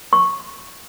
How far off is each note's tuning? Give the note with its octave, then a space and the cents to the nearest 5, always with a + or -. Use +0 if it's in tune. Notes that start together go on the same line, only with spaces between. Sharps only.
C#6 -5